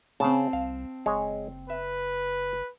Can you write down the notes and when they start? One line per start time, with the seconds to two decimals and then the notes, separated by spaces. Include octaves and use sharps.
0.20 C#3 C4 A5
0.53 C2 F5
1.06 F#1 G#3 C#5
1.70 B4 E5